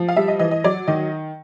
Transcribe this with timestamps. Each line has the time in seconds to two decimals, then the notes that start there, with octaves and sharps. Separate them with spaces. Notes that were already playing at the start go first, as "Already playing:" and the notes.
Already playing: F3
0.08 F5
0.16 G3 E5
0.28 D#5
0.39 E3 D#5
0.51 D#5
0.64 F#3 D5
0.87 D#3 D#5